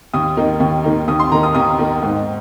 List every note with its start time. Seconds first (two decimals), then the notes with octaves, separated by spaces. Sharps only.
0.14 D#2 D#6
0.37 D#3 A#3 D#4
0.60 D#2
0.84 D#3 A#3 D#4
1.08 D#2 D#6
1.20 C6
1.31 D#3 A#3 A#5
1.43 D#6
1.55 D#2 D#6
1.78 D#3 A#3
2.03 G#2